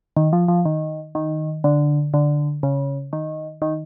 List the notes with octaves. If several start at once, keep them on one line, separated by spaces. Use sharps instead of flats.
D#3
F3
F3
D#3
D#3
D3
D3
C#3
D#3
D#3